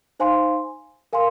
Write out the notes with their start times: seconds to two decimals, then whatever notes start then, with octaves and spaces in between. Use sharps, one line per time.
0.19 D#4 C5 F5 G#5 C6
1.13 A#4 F5 G#5 C6